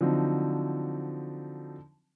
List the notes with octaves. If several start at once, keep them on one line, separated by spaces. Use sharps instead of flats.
D3 F3 F#3 C4 D#4